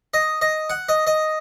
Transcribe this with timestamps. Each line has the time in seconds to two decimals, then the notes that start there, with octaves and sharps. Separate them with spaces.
0.14 D#5
0.41 D#5
0.70 F#5
0.89 D#5
1.07 D#5